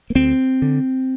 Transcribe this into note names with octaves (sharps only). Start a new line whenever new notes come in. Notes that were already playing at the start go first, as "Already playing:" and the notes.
A#3
D2 C4
D3